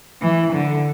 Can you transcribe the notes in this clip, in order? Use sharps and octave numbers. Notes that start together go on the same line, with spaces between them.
E3
D3